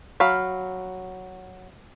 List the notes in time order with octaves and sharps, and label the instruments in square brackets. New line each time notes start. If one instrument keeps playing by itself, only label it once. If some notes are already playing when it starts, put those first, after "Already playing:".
[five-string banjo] F#3 F5 B5